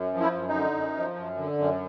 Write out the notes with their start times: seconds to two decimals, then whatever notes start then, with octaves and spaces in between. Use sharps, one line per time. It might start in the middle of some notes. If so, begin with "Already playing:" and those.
Already playing: F#2
0.14 F3
0.20 E4
0.34 F#2
0.48 D#4
0.54 D3
0.75 F#2
0.96 F3
1.16 F#2
1.38 D3
1.58 F#2